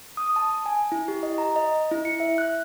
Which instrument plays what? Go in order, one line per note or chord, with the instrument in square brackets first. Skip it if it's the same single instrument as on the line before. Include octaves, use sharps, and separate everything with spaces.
[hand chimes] D#6
A5
G#5
E4
G4
D#5
A#5
D#5
E4
C#7
E5
F#6